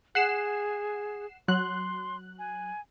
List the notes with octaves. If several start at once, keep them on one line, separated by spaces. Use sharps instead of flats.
G#4 F#5 C7 E7
F#3 C6 F#6
G#5